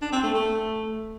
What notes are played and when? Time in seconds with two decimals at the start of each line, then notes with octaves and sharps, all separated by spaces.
0.02 D4
0.13 C4
0.23 A3
0.34 A3